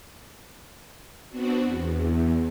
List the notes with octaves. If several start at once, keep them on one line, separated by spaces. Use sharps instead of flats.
B3 C4 D4 F#4
E2